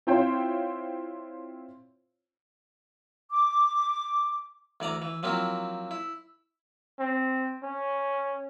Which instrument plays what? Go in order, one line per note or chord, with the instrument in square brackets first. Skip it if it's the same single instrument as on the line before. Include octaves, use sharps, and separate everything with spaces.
[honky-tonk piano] C4 E4 F4 C5 C#5 G5
[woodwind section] D6
[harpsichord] D2 E3 D5 A#5
E3
F3 F#3 A#3 C4 E4
E4
[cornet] C4
C#4